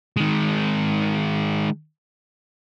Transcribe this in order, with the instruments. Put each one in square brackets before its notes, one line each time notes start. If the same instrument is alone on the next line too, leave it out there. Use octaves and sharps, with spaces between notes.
[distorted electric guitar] D#3 G#3